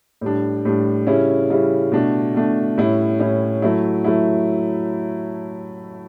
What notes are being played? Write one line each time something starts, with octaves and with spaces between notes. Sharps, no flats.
A2 G3 D4
A2 G3 D4
C#3 G3 C#4 E4
C#3 G3 C#4 E4
B2 A3 D4
B2 A3 D4
A2 G3 C#4 E4
A2 G3 C#4 E4
F#3 A3 E4
F#3 A3 E4